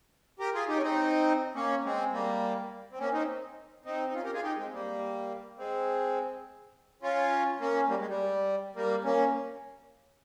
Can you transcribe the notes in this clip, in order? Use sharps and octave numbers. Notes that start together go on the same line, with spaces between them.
G4 A#4
F4 G#4
D#4 G4
C#4
C4 D#4
A#3 C#4
G#3 C4
G3 A#3
C4
A#3 C#4
C4 D#4
C4 D#4
D#4
C#4 F4
G4 A#4
F4 G#4
D#4 G4
G#3 C4
G3 A#3
G#3 C4
C#4 F4
A#3 C#4
G3 A#3
G#3
G3
G3 A#3
A#3 C#4